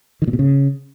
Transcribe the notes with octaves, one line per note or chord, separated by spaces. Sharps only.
D#3
A#2
B2
C#3